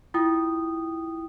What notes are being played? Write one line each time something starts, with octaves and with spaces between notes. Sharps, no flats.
E4 F4 G5 D#6